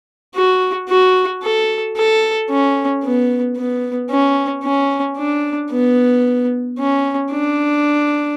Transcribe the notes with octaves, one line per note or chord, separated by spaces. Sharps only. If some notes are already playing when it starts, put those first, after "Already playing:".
F#4
F#4
A4
A4
C#4
B3
B3
C#4
C#4
D4
B3
C#4
D4